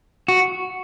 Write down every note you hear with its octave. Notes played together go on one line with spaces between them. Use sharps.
F#4